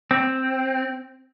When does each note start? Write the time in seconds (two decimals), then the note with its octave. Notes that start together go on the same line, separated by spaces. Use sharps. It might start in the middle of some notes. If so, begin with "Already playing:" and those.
0.11 C4